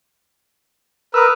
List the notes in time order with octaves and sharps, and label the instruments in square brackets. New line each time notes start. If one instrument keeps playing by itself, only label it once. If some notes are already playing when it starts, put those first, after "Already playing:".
[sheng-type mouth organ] A#4 B4 [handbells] D#6 E6